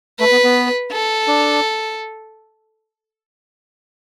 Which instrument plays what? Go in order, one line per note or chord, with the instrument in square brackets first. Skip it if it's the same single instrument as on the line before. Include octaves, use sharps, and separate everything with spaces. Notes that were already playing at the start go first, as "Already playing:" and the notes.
[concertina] A3 [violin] B4
[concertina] B3
B3
[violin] A4
[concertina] D4